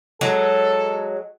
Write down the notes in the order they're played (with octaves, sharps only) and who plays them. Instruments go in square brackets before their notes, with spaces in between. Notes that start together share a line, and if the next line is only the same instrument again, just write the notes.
[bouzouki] F#3 G#3 [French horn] A4